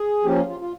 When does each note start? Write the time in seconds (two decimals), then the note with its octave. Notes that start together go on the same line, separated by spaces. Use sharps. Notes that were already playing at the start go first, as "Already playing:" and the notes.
Already playing: G#4
0.24 F3 A#3 C#4 G4
0.36 F4
0.48 F4
0.60 F4